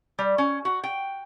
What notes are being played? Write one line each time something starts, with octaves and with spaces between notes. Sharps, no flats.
G3
C#4
F#4
G5